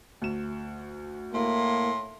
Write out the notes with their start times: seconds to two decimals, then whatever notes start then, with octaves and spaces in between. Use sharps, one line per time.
0.22 D2 E7
1.33 A2 A#3 E4 C6